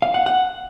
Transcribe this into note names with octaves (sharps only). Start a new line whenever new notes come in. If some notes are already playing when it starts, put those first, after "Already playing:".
F5
F#5
F#5